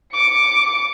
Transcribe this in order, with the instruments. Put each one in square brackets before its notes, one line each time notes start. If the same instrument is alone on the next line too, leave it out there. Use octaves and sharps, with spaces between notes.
[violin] D6 C#7